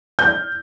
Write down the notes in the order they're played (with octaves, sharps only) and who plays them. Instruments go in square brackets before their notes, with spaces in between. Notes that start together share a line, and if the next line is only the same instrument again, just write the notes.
[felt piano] G6